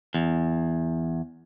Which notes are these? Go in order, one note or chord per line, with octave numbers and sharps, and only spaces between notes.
E2